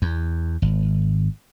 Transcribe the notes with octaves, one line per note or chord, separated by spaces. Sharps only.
E2
G#1